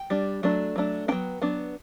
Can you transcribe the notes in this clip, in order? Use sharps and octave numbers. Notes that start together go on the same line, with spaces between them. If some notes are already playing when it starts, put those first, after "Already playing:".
Already playing: G5
G3 D4
F#3 A3 D4
F#3 A3 D4
F#3 B3 D4 G5
F#3 B3 D4